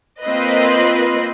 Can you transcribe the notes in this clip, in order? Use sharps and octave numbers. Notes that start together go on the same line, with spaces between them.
A#3 C4 F4 B4 D#5